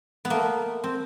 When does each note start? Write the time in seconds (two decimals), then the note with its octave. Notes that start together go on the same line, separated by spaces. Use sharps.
0.25 B3
0.30 A3 A#3
0.84 C4